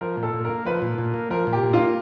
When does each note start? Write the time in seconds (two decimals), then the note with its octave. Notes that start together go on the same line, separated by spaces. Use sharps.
0.01 F3 A#4
0.17 A#2
0.23 A4
0.34 A#2
0.45 A#3 A#4
0.66 F3 B4
0.82 A#2
0.98 A#2
1.14 A#3
1.30 F3 A#4
1.47 A#2
1.53 G4
1.63 A#2
1.73 F4
1.79 A#3